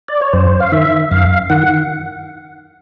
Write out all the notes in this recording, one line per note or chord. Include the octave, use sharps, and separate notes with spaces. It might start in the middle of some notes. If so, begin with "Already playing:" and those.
D5
C#5
F#2 C5
F5
D#3 E5
F#2 F5
D#3 F#5